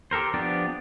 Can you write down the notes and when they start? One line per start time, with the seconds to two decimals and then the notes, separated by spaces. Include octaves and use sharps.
0.11 G4 A4 A#4 C5
0.34 F3 B3 D4 G4 D5